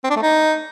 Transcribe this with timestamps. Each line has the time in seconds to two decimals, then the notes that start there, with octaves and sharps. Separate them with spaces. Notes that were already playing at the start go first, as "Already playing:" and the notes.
0.04 C4
0.10 D4
0.16 A3
0.22 D#4